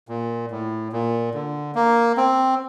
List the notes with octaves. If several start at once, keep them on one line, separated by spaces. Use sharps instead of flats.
A#2
A2
A#2
D3
A#3
C4